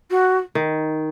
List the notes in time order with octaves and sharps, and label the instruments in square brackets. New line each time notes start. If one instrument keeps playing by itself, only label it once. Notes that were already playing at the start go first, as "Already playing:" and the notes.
[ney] F#4
[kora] D#3